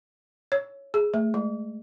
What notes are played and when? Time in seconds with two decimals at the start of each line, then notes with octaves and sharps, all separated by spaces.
0.52 C#5
0.94 G#4
1.14 A3
1.34 G#3